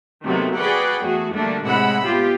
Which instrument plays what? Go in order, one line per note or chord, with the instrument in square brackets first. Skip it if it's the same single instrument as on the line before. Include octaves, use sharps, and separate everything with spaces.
[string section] D#2 C3 D#3 F#3 A3 B3
F#4 G#4 B4 D5 F#5 G5
E2 A3 F#4 G#4
D3 G3 A3 A#3 D4
A2 C3 G#3 F#5 B5 E6
B3 F4 G4